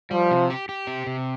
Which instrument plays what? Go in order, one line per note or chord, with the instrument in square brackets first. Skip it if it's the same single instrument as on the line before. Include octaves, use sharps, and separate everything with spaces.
[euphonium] F3 [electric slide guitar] G3
[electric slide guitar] C3
G4
G4
C3
C3